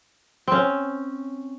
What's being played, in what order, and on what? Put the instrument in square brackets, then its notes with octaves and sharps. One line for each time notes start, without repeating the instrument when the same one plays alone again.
[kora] C4 C#4